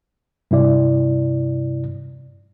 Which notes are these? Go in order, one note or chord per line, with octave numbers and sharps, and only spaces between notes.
G2 C3 E4 D5